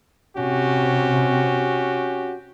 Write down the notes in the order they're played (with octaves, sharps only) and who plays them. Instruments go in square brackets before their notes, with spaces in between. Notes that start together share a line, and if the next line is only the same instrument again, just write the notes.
[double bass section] C3 [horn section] C#4 F#4 G4